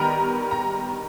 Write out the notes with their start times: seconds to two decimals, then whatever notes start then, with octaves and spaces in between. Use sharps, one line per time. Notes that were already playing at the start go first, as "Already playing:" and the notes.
Already playing: D#3 G3 B3 A#4 A#5
0.51 A#5